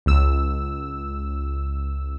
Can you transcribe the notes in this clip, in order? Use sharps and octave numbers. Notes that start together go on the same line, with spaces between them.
C#2 E6